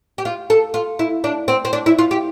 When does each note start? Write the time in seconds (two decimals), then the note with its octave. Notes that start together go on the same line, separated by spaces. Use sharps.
0.18 G4
0.25 F4
0.50 A4
0.74 F4
0.99 E4
1.24 D4
1.48 C4
1.65 C4
1.73 D4
1.86 E4
1.99 F4
2.11 G4